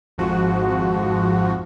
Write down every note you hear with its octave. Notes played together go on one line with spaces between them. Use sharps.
G#1 F2 G#2 F3 F#4